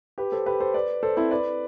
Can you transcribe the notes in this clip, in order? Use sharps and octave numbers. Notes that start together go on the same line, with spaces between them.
G4 B4
A4 C5
G4 B4
A4 C5
B4 D5
A4 C5
C4 E4
B4 D5